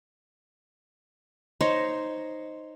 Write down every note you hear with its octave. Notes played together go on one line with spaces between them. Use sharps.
D#4 C5 C#5